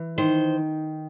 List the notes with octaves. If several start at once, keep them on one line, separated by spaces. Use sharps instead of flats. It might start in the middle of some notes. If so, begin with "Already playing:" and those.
Already playing: E3
D#3 C5